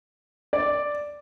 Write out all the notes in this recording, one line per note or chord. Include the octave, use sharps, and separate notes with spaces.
D5